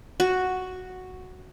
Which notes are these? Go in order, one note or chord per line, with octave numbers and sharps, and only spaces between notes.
F#4